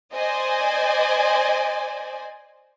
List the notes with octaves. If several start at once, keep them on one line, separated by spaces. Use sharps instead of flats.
C5 D5 D#5 G#5